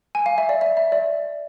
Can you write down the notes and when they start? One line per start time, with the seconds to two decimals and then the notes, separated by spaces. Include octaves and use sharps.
0.15 G#5
0.26 F5
0.38 E5
0.49 D5
0.61 E5
0.77 E5
0.92 D5